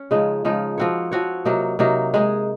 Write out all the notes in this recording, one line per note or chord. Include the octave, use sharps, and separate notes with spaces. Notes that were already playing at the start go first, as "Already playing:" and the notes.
Already playing: C#4
C#3 F3 G#3 D#4
C#3 F3 G#3 D#4
F3 C4 F#4 C#5
F3 C4 F#4 C#5
C3 F#3 A#3 D#4
C3 F#3 A#3 D#4
G#3 D#4 G#4